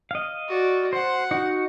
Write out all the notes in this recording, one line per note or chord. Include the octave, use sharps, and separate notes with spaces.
D#5 F5
F#4 D5
C5 F#5
D#4 F#4